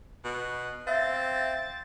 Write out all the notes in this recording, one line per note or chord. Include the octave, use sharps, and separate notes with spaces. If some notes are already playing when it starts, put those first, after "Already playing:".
B2
C4 E5 F5 A6